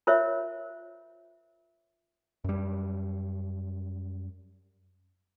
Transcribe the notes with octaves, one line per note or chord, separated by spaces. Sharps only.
F4 A#4 C5 C#5 E5
F#2 G3